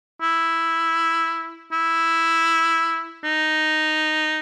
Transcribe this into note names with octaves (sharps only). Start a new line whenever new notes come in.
E4
E4
D#4